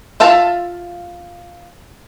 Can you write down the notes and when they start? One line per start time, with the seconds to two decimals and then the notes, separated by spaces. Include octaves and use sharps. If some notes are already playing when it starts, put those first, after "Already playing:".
0.20 F4 E5 F5 A5